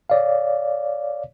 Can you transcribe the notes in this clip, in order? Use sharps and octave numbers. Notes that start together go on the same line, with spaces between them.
C#5 D5 F5